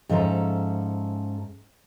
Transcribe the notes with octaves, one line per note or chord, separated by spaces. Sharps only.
G#2 F3 C#4 A4 E5 A#5